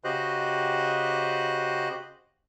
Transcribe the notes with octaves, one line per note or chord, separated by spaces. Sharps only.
C#3 F#4 G4 C5 D#5 F#6